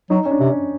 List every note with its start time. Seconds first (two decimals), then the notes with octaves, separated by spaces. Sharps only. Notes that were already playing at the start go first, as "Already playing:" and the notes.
0.10 F#3 D#4
0.25 C#4
0.31 D4
0.40 C3
0.50 C#4